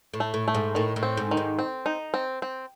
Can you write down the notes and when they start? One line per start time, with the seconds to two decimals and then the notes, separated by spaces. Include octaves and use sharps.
0.14 A2
0.20 A3
0.34 A2
0.48 A3
0.54 G#2
0.75 A2 D#3
0.96 A2
1.03 C4
1.17 G#2
1.31 D#3
1.37 G#2
1.59 C4
1.86 D#4
2.14 C4
2.42 C4